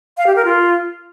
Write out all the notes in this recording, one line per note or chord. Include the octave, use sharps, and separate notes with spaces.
F5
G4
A#4
F4